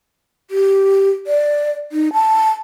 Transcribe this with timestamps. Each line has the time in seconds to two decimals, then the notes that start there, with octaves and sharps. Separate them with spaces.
0.51 G4
1.27 D5
1.92 D#4
2.13 A5